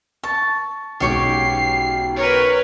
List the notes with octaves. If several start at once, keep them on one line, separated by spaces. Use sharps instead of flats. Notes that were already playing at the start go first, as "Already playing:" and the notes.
A5 C#6
B1 G#2 C#4 G4 C#5 D6 C7
A#4 B4 C#5